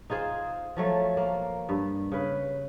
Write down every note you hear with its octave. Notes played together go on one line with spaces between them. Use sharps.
D#4 F4 G#4 C5
F3 F#3 A3
A#3
G2
C#3 B4